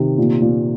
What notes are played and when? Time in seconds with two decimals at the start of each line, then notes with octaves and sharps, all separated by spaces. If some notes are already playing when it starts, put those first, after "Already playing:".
Already playing: C3 D#3
0.18 A#2
0.42 A#2